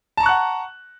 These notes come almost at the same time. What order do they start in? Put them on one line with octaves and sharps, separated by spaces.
A5 A#5 C#6 F#6 F#5